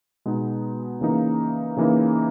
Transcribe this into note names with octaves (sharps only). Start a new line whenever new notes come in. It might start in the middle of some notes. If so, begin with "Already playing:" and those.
B2 G#3 B3 D#4
C#3 E3 A#3 D#4
C#3 E3 A#3 D#4